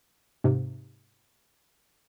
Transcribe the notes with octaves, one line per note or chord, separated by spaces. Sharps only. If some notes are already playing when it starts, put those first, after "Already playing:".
G#2 C3